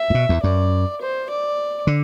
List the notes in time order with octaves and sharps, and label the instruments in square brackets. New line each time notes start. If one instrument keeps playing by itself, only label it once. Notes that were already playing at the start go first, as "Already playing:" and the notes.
Already playing: [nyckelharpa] E5
[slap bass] A2
B2
E2
[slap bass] F#2 [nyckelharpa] D5
[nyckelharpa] C5
D5
[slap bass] D3